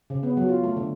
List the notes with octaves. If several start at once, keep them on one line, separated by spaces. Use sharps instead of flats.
C#3
B3
F#3
F4
A3
D3